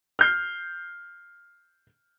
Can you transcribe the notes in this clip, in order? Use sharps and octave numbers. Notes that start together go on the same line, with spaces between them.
F6 G6 C7